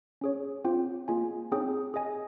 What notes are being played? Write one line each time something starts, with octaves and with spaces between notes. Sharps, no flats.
C#4 G#4 C#5
C4 F4 C5 G5
A#3 F4 G#4 D#5 G#5
C4 D#4 G#4 C#5 G5
G#4 D#5 G#5